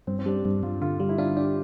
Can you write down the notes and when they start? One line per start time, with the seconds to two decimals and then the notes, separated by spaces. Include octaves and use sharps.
0.07 G2 C4
0.19 C4
0.26 G3 D4
0.45 G2
0.63 G2 F4
0.82 D3 F4
1.00 G3 F4
1.09 E4
1.18 D4 F4
1.36 D4 G4